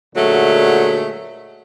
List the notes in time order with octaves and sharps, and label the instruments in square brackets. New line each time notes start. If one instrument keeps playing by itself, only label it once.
[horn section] A#2 D3 F#3 G#3 A3